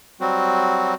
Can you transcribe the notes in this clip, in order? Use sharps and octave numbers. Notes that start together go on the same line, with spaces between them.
F#3 G3 C4 F#4